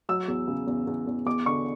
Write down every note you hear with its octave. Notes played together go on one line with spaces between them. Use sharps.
F#3 E6
E2
C#3
E2
E2
E2
E2 D6
D3 C#6